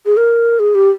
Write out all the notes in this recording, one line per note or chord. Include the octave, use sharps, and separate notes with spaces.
G#4
A#4
G#4
G4